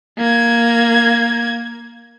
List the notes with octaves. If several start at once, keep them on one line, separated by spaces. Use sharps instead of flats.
A#3 G#6